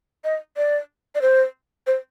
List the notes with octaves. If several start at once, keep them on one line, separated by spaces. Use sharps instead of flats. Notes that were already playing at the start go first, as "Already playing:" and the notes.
D#5
D5
D5
C5
C5